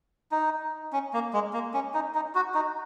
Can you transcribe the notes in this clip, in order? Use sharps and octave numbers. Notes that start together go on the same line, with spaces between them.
D#4
C#4
A#3
G#3
A#3
C#4
D#4
D#4
F#4
D#4